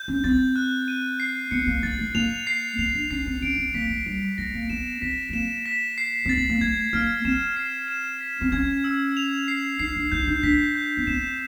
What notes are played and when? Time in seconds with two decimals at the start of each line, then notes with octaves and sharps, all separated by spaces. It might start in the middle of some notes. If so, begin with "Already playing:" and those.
Already playing: G6
0.08 C#4
0.24 C4 A6
0.56 F#6
0.88 D#7
1.20 C7
1.51 B3 C#7
1.67 A#3
1.83 A#3 A6
1.99 A3
2.15 A#3 F7
2.47 C7
2.78 B3 F7
2.95 D4
3.11 C#4 C7
3.26 C4
3.42 C#4 D7
3.58 C4
3.74 A#3 B6
3.90 A3
4.06 G3 D7
4.38 G#3 A#6
4.54 A#3
4.70 B3 E7
5.02 C4 B6
5.29 A3
5.33 A#3 E7
5.66 B6
5.98 C7
6.25 C4 A6
6.37 B3
6.49 A#3
6.61 A3 G#6
6.93 A#3 F6
7.25 C4 E7
7.57 C7
7.88 E7
8.21 B6
8.41 C4
8.52 C#4 G#6
8.84 E6
9.17 F7
9.48 C7
9.79 D#4 C7
9.96 D4
10.12 D#4 G6
10.27 D#4
10.43 D4 B6
10.75 G6
10.97 B3
11.07 C4 E7